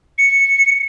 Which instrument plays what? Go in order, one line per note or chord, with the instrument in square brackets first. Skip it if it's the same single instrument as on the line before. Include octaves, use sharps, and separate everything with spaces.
[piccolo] C#7